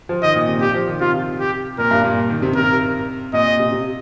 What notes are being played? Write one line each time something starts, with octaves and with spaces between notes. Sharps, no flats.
F3
D#3 D#5
A#2
C3
G4
F3
D#3
C3 F4
G4
A#2 A#4
G2
A#2
D#3
C3
C3 A#4
A#2 D#5
A#2
C3
C3